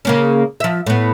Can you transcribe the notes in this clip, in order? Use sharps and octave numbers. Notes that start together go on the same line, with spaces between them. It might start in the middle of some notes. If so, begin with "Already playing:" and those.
C#3 A#3 C#4
F3 E5
A2 B3